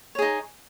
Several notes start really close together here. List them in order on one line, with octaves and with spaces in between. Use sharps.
C#5 G#4 D#4